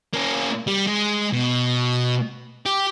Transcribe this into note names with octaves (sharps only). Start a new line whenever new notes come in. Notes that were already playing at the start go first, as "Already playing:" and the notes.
A#3 C#4
G3
G#3
B2
G4